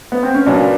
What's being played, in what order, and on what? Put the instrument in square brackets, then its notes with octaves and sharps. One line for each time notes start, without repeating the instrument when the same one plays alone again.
[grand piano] B3
C4
C#4
[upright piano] A#2 F#3 B3 [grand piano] D4